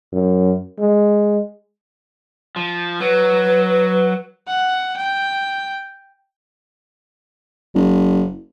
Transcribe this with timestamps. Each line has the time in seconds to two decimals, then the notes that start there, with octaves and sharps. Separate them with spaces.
0.13 F#2
0.79 G#3
2.56 F3
3.00 F#3 B4
4.48 F#5
4.97 G5
7.74 F#1